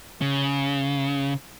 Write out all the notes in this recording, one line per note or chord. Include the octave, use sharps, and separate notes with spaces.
C#3